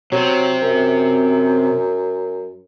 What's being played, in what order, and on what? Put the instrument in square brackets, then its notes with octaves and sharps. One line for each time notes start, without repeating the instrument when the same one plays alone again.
[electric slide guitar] C3 C4 [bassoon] F#3
[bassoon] F#2